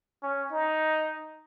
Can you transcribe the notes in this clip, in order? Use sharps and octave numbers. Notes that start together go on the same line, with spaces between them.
C#4
D#4